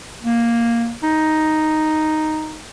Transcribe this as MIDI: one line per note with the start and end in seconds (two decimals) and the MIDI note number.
0.23 0.92 58
1.03 2.61 63